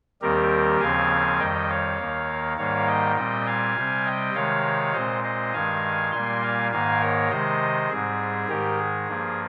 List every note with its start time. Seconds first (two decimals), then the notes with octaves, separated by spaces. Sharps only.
0.22 D#2 D#3 G3 C4 G4 A#4
0.80 D#2 C#3 F3 C4 F5 G#5
1.39 F2 D#3 G3 D#5 G5
1.69 C#5 F5
1.99 D#2 D#3 A#3
2.57 G#2 D#3 G3 A#3 C#5 F5
2.88 D#5 G5
3.16 A#2 G3 C4 D#5 G5
3.46 F5 G#5
3.76 C3 G3 C4
4.05 D#5 G5
4.34 C3 D#3 G#3 C#5 F5
4.93 A#2 G#3 C4 C5 D#5
5.24 C5 D#5
5.53 G2 D#3 G#3 F5 G#5
6.12 A#2 G3 A#3 G#5 C6
6.42 F5 G#5
6.71 G#2 D#3 A#3 F5 G#5
7.01 A#4 C#5
7.30 C3 D#3 G#3 C5 D#5
7.89 G#2 G3 C4 G#4
8.48 G#2 D#3 G#3 G4 A#4
8.79 G#4
9.08 G2 F3 A#3